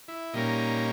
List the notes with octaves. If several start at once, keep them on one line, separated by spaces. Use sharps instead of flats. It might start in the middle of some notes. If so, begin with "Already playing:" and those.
E4
A#2 G3 A#3 C#4 D#4